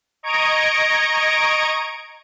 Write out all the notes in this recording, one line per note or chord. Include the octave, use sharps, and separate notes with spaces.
D#5 A#5 C#6 G#6 D7